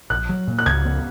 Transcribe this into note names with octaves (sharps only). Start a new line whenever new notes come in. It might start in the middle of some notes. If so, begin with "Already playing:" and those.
A#1 F#6
F#3
A#2
F#6
C#2 G#6
B3